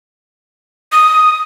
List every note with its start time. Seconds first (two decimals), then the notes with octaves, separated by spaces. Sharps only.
0.92 D#6